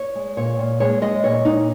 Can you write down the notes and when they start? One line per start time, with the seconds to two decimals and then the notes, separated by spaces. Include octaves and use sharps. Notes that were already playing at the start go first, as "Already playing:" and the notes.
Already playing: C#5
0.15 G#3
0.37 A#2 C#5
0.59 A#2
0.80 G#3 C#5
1.02 G#3 D#5
1.24 A#2 C#5
1.45 A#2 D#4